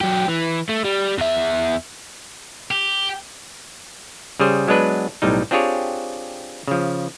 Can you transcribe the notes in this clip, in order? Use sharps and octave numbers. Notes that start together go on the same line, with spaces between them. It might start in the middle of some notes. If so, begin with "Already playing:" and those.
F#3 G4
E3
A3
G3
E2 E5
G4
C#3 G3 G#4 C5
F#3 G#3 B3 D4 B4
B1 A2 G3 D#4
C4 D4 F4 G4 G#4 C#5
C#3 F3